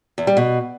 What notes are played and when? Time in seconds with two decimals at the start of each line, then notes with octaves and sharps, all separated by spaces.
0.18 E2
0.27 G3
0.37 B2